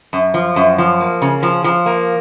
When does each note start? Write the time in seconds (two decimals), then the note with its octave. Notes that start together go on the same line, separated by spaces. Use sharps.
0.13 F#2
0.34 F3
0.56 F#2
0.78 F3
1.00 A#3
1.22 C#3
1.43 F3
1.64 F3
1.86 A#3